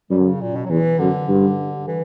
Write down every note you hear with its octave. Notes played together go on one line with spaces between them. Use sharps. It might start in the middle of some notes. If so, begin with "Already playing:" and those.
F#2 G3
D3
C#3
A#2
B2
F#3
E2 E3
F#2 D3
G2
E3